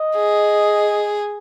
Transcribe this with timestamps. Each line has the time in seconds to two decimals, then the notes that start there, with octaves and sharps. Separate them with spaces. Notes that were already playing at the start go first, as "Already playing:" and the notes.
Already playing: D#5
0.16 G#4